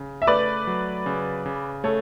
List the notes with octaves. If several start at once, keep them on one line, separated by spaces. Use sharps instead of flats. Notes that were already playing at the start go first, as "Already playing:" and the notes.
Already playing: C#3
E5
A3 B4 D5
F#3
C#3
C#3
A3 A4 C#5